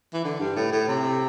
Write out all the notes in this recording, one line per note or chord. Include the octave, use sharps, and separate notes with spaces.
E3
D3
G2
A2
A2
C3